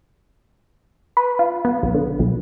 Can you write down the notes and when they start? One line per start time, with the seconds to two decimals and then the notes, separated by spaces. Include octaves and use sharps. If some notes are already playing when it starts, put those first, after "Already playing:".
1.17 B4
1.39 F4
1.65 B3
1.83 B1
1.94 D3
2.19 B1